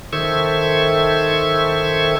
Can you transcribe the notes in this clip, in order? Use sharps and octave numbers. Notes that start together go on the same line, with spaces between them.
D#3 A4 C5 E5 C#6 G#6